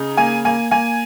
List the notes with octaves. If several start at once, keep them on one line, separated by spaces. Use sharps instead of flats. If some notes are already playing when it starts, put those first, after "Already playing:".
Already playing: C#3 D#4
A#3 G#5
A#3 G#5
A#3 G#5